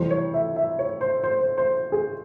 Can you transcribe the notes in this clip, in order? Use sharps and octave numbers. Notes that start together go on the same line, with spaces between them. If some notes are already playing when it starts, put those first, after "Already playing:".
Already playing: F2 C3 E3 G3 C5
C#5
E5
E5
C#5
C5
C5
C5
C5
G#4